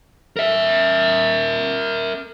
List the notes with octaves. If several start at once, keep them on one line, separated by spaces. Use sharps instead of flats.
A#4 E5